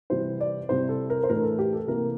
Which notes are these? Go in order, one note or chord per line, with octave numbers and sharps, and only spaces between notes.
C3 E3 G3 C4 E4 C5
D5
C3 G3 C4 E4 C5
A4
A#4
C5
A2 E3 A3 D4 A#4
A4
G4
A4
C3 E3 A#3 A#4